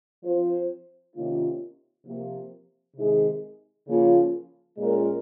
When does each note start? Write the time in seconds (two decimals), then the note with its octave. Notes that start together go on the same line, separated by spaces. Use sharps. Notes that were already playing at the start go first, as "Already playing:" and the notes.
0.23 F3 C4 F4 C5
1.14 C3 D#3 A#3 C#4 F4
2.04 C3 F3 A#3
2.96 C3 D#3 G#3 D#4 G#4
3.87 C#3 F3 A#3 C#4 F4
4.77 A#2 G#3 C#4 F4 A#4